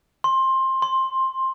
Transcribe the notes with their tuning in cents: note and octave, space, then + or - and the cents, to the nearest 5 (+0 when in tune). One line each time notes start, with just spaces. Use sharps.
C6 +15
C6 +10